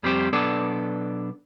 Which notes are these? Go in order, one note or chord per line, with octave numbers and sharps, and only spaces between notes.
F2 G3 C4 G4 C5
B1 B3 D4 A4 D5